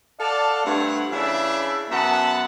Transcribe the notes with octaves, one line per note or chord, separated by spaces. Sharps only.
A4 D5 F5 F#5 A5
G2 A3 C4 C#5 F#5
C#3 E3 D4 E5
F#2 B3 E5 F#5 A5